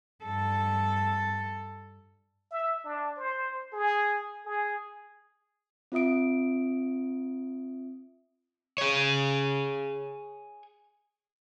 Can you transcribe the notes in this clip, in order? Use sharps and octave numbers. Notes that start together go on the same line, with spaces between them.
G2 A4
E5
D4
C5
G#4
G#4
C4 F4 E5 D#6 D7
G#4 C#5